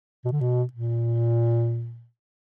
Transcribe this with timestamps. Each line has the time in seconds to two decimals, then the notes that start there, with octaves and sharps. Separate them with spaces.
0.25 B2
0.32 D3
0.41 B2
0.73 A#2